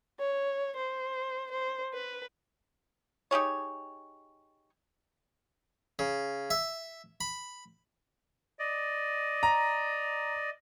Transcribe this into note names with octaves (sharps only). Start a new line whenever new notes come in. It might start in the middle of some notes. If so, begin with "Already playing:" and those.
C#5
C5
C5
B4
D#4 G4 G#4 C#5
C#3
E5
B5
D5 D#5
A#5